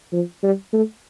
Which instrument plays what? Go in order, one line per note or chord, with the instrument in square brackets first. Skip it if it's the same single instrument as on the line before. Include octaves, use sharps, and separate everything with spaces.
[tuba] F3
G3
A3